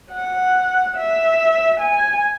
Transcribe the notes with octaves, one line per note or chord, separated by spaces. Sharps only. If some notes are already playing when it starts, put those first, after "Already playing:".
F#5
E5
G#5